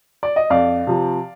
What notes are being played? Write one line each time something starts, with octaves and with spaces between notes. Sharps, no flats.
D5
D#5
F2 D5 F5
C3 F3